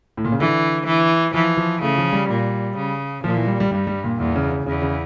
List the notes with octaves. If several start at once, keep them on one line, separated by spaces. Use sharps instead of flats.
A2
A#2
C#3
D3 E3
E3
E3 F3
F3
C#3 A3
F3
G3
A#2
C#3
A#2 F3
E3
G3
G3
G2 G3
G3
A#2
E2 A#2
C#3
C#3
E2 C#3
C#3